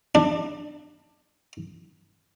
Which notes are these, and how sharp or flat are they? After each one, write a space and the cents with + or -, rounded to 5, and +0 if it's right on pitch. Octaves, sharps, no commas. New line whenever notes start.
D4 +20